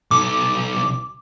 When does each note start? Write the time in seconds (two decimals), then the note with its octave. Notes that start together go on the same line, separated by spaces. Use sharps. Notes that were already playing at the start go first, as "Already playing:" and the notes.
0.11 B1 A4 D6